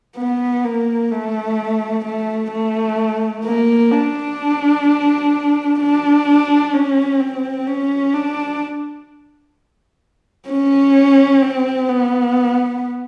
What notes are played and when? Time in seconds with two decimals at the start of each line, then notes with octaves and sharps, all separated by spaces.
0.18 B3
0.64 A#3
1.11 A3
2.05 A3
2.52 A3
3.46 A#3
3.92 D4
5.80 D4
6.74 C#4
7.20 C4
7.67 C#4
8.14 D4
10.48 C#4
11.42 C4
11.89 B3